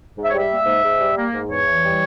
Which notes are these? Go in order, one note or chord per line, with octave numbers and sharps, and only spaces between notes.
G#2
E5
G3 C#5
E5
A#3
G#2
G#2
G3
A#3
G#2
E2 C#5
E3
G3